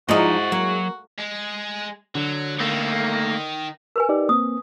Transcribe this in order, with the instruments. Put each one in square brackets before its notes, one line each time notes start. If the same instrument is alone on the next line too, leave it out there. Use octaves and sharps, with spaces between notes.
[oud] F3 D#4 [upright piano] G#3 E4 [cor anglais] F#4 [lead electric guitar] C5 D#5
[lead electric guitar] F#3 [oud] A#3
[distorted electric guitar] G#3
[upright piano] D3 [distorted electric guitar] F#3
[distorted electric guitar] D#3 [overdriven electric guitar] A3 A#3
[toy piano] A#4 B4 G#5
[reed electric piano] D#4 G4 D5
[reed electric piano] A#3 C4 [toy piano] D#6